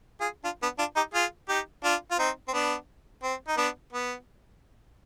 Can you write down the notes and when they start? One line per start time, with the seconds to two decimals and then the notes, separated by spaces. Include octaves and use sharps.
0.21 F4 G#4
0.44 D4 F4
0.62 B3 D4
0.79 D4 F4
0.96 D#4 G4
1.14 F4 G#4
1.49 D#4 G4
1.83 D4 F4
2.11 F4
2.19 C4 D#4
2.48 C4
2.53 B3 D4
3.23 C4
3.48 D#4
3.57 B3 D4
3.93 B3